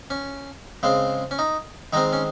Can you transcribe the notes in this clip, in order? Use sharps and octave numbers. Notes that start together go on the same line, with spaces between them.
C#4
C#3 G#3 C4
C#4
D#4
D#3 G#3 C4 D#4
C#4